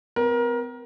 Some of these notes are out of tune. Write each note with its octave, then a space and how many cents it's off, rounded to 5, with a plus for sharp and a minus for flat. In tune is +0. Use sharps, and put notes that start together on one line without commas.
C4 -45 A#4 +25